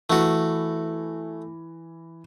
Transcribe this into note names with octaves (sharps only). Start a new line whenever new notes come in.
E3 A3 F#4